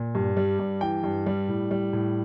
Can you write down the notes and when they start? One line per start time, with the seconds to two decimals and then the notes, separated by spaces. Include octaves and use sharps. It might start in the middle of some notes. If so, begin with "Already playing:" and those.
Already playing: A#2
0.15 G2
0.37 G3
0.59 G2
0.81 E3 G5
1.04 G2
1.26 G3
1.48 A2
1.71 G3
1.93 A2